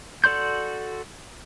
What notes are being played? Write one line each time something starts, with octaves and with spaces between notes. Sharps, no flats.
F#4 A4 D5 C6 G6